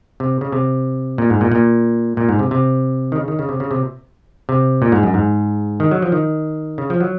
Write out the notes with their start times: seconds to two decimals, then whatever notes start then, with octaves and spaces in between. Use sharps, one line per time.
0.20 C3
0.41 C#3
0.52 C3
1.18 A#2
1.30 G#2
1.41 A#2
1.52 A#2
2.17 A#2
2.29 G#2
2.39 C3
2.51 C3
3.12 D#3
3.16 C#3
3.28 D#3
3.39 C#3
3.49 C3
3.60 C#3
3.71 C3
4.49 C3
4.82 A#2
4.92 G#2
5.03 F#2
5.14 G#2
5.80 D#3
5.91 F#3
6.02 F3
6.12 D#3
6.78 C#3
6.90 F3
7.00 F#3